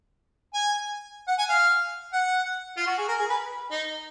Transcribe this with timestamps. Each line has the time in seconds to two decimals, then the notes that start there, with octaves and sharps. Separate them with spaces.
0.54 G#5
1.28 F#5
1.38 G#5
1.49 F5
2.13 F#5
2.77 F4
2.87 F#4
2.98 G#4
3.08 A#4
3.19 G#4
3.30 B4
3.71 D#4